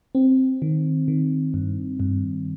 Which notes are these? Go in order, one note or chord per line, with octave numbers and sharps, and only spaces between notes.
C4
D#3
D#3
G2
G2